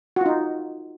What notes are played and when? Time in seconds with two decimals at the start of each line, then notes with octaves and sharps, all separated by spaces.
0.16 F#4
0.21 F4
0.26 D#4